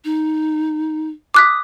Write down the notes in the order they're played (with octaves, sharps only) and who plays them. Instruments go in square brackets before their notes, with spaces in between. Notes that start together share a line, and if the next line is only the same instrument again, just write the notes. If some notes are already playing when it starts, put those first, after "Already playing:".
[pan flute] D#4
[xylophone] D6 F#6 B6 [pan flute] D#6